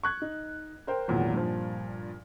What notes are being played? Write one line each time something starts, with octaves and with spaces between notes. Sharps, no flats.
C#6 F#6 G#6
D#4
A#4 C5 G5
G#1 E2 A#2 F#3
G2 A#2 F3